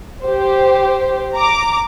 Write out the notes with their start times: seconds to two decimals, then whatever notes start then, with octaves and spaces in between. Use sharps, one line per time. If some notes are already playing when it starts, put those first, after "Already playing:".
0.23 G4 C5
1.34 A#5 D6